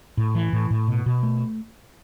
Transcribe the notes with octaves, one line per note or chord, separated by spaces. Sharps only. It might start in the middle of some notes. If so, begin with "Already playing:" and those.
A2
E3
A2
A2
B2
B2
A3